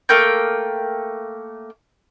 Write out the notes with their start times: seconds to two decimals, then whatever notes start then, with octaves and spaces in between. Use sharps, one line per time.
0.09 A3 A#3 G5 G6